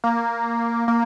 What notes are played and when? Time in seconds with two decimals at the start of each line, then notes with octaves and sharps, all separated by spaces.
0.04 A#3
0.88 A#3